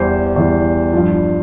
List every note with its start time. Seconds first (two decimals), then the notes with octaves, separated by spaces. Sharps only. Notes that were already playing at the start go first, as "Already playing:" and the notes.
Already playing: E2 E3 G3 C5
0.36 E2 E3 G3
0.93 G2 F3